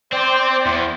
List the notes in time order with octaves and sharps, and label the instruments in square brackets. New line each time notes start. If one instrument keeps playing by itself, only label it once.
[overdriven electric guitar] C4 [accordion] C5 D5 G5
[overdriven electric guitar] E2